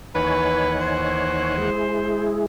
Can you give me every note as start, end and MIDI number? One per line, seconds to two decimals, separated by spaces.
0.15 1.70 39
0.15 1.70 52
0.15 1.57 63
0.15 0.75 71
0.15 1.57 73
0.15 1.70 78
0.15 1.57 80
0.80 2.42 72
1.58 2.46 56
1.58 2.46 64
1.58 2.46 68